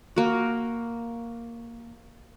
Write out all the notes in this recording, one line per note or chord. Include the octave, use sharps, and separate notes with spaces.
A#3 F#4